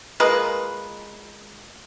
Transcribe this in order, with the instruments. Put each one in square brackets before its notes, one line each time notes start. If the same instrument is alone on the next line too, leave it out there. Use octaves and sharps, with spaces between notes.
[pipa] G#3 A#3 F4 B4